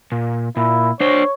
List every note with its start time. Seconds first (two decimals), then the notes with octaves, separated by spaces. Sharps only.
0.12 A#2
0.57 A#2 E4
1.00 D4 C5 C#5